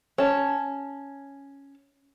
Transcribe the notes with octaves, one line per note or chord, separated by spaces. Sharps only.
C#4 A5